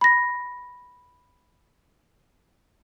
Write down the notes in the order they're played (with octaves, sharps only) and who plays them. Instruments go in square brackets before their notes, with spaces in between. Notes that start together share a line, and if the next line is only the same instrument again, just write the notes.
[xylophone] B5 A#6